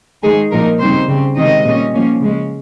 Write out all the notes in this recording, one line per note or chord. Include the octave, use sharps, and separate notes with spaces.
D#3 G#3 D#4 G#4
A#2 F3 A#3 D#4 A#4
C#3 G3 C4 D#4 C5
C#3 G3 C4
C3 D#3 G#3 C4 D#4 D#5
A#2 G3 C#4
F3 A#3 C#4
C#3 G#3 C#4